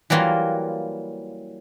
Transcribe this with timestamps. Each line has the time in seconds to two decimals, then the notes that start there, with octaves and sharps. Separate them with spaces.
0.10 E3 F#3 G3 A#3 F4